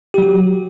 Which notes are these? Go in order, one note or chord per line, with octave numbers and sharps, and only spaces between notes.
F#3 F#4 G4